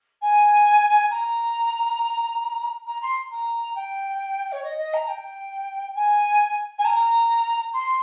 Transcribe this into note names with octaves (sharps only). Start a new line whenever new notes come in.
G#5
A#5
A#5
C6
A#5
G5
C#5
D#5
D#5
A#5
G5
G#5
G#5
A#5
C6